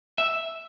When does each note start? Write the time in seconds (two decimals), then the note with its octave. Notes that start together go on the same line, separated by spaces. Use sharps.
0.18 E5